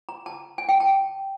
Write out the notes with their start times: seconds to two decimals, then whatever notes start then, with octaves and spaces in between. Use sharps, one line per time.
0.09 A#5
0.26 A5
0.58 G#5
0.69 G5
0.80 A5